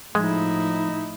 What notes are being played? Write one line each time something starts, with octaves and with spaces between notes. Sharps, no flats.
A2 F3 G#3 D#4 E4